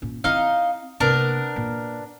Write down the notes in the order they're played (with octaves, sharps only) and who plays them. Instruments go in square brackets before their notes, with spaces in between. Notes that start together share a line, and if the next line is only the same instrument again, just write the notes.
[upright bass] A#2 C#4
[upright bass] C4 E4 [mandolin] D#4 D#5 F5
[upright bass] C3 A#3 [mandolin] B3 D4 A#4
[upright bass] A#2